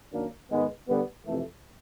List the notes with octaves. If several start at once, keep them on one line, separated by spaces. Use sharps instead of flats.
F#2 D#3 F#3 A#3 D4
G#2 D#3 G#3 B3
D3 G3 B3
F2 C3 E3 A3